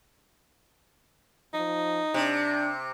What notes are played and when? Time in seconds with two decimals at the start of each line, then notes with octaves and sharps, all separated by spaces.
1.54 F3 D#4
2.14 C3 D4